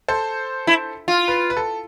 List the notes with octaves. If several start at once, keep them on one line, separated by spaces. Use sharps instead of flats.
A4 C5
E4
F4
B4
B4
A4